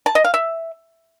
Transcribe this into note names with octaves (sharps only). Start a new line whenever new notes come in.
A5
D#5
F5
E5